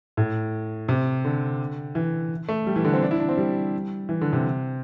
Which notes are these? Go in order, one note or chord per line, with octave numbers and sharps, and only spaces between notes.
A2
C3
D3
E3
A3
G3
E3
D3
C4
D4
E4
D4
C4
G3
E3
D3
C3